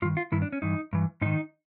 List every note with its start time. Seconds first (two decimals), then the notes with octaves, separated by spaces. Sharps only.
0.02 G2 F4
0.05 D#3
0.17 F4
0.32 G2 D#3 E4
0.42 D4
0.53 C#4
0.62 G2 E3 D#4
0.93 G2 E3
1.21 G#2 D#3 D#4